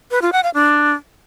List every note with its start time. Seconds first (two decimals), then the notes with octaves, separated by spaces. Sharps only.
0.11 B4
0.22 F4
0.32 F#5
0.43 F5
0.54 D4